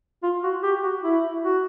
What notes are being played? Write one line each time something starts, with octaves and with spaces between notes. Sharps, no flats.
F4
F#4
G4
F#4
E4
F#4